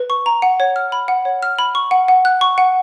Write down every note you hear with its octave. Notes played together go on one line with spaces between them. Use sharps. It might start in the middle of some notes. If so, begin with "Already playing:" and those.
Already playing: B4
C#6
A#5
F#5
C#5
F6
B5
F#5
C#5
F6
B5
C#6
F#5
F#5
F#6
C#6
F#5